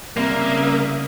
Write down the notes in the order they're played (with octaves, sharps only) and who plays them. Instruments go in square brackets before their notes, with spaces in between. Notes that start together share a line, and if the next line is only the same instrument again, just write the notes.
[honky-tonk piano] C2 [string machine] C#3 E5 D#6 [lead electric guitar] A#3